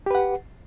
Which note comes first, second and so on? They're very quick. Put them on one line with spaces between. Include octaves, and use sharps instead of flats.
G4 B4 F#5